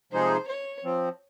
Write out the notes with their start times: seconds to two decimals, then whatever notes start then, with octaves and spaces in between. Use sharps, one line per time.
0.12 C3 F3 G#3 D#4 G#4 C5
0.47 C#5
0.84 F3 C4